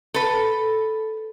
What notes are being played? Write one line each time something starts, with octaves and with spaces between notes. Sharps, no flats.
A4 B4